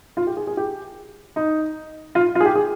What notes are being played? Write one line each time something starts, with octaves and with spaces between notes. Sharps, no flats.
F4
G4
G#4
G#4
G4
D#4
F4
F4
G#4
G4
G#4